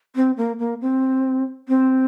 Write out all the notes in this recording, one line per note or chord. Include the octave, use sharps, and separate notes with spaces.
C4
A#3
A#3
C4
C4